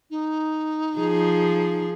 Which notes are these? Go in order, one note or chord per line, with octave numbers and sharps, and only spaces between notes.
D#4
F3 G#4